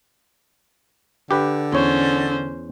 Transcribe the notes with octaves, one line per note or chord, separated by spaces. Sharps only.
D3 G4 B4
E2 C#4 C5 C#5